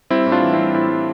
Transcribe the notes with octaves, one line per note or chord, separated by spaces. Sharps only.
G3 C4 E4
A2
D4 F4
E3
C4 E4
G3
A2 C4 E4
G3